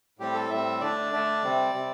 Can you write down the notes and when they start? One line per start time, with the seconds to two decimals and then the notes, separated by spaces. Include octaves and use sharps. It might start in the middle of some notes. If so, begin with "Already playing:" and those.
0.19 A2 G3 C4 G4
0.35 A4
0.50 A2 G3 C4 E5
0.81 D3 A3 D4 D5
1.12 D3 A3 D4
1.43 C3 G3 C4
1.74 C3 G3 C4